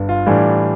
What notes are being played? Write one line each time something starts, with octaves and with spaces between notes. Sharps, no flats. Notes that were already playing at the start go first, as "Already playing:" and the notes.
Already playing: G1 G2
F4
A2 E3 G3 D4